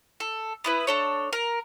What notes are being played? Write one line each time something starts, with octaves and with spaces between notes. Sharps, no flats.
A4
B3 E4 B4
D4 A4 C#5
A#4